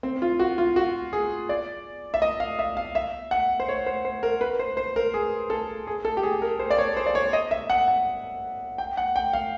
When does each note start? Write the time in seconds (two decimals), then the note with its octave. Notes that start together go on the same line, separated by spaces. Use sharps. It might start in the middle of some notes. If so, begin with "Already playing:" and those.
0.03 C4
0.22 F4
0.39 F#4
0.58 F4
0.76 F#4
1.13 G#4
1.49 D5
2.14 E5
2.22 D#5
2.40 F5
2.59 E5
2.77 F5
2.95 E5
3.31 F#5
3.60 C5
3.69 C#5
3.86 C5
4.05 C5
4.23 A#4
4.41 B4
4.59 C5
4.77 C5
4.96 A#4
5.14 G#4
5.50 A4
5.87 G#4
6.05 A4
6.17 G4
6.23 G#4
6.42 A#4
6.59 C5
6.71 D5
6.79 C#5
6.97 C5
7.06 D5
7.15 C#5
7.33 D#5
7.51 E5
7.70 F#5
7.88 F#5
8.78 G5
8.97 F#5
9.16 G5
9.33 F5